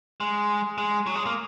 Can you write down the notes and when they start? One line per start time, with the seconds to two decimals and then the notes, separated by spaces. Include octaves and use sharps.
0.20 G#3
0.78 G#3
1.06 F#3
1.15 G#3
1.26 A#3